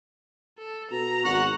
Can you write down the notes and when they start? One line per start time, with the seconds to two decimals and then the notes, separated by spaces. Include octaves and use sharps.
0.58 A4
0.91 B2 A#5
1.24 G#1 F#4 F#5